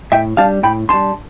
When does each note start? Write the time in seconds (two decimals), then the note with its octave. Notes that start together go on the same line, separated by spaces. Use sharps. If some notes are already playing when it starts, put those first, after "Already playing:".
0.12 A2 E5 G5
0.37 G3 D4 F5 A5
0.63 A2 G5 B5
0.89 G3 D4 A5 C6